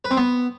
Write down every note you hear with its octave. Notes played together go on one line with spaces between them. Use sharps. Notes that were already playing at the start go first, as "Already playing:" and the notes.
B4
C4
B3